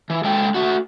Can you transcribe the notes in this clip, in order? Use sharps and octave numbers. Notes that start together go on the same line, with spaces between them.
E3
G#3 A4 G5
A3 F#4